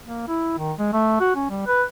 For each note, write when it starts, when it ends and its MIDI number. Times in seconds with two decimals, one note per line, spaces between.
0.07 0.24 58
0.28 0.57 64
0.58 0.72 51
0.79 0.90 56
0.93 1.18 57
1.20 1.35 66
1.36 1.47 61
1.50 1.64 55
1.67 1.83 71